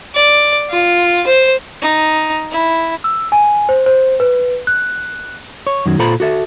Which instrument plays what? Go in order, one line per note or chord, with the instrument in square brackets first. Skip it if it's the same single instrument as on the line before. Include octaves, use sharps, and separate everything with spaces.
[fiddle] D5
F4
C5
D#4
E4
[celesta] E6
G#5
C5
C5
B4
F#6
[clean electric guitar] C#5
F#2 D#3 F#3
A#2 F4 A4 C5 A#5 B5
F#4 A4 E5